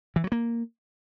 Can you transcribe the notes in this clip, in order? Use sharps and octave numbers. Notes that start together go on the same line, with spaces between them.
E3
F#3
A#3